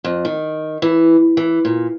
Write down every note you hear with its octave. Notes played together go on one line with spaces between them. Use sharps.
F2
D#3
E3
E3
A#2